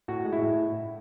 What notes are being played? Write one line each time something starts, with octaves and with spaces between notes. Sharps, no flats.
A2 F#4
G#3
E4
A2